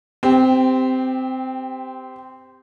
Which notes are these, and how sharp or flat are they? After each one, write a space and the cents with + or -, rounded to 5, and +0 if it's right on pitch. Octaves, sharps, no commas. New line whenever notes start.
C4 -15 G4 +15